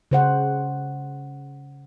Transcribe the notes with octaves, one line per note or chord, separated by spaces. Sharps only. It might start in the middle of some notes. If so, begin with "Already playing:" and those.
C#3 C5 F#5